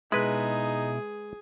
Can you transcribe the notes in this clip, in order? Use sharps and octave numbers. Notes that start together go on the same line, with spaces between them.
B2 G#3 D#4 E4 G#4 B4